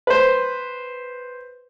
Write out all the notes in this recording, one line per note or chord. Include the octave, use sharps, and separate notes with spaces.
B4 C5